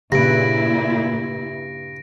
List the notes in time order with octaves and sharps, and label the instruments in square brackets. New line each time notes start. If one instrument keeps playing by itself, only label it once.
[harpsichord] G2 [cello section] A#2 E4 [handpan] C#3 B4 [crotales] A#6 D7